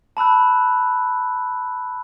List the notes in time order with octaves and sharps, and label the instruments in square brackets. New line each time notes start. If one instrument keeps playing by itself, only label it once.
[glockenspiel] A5 B5 E6 F#6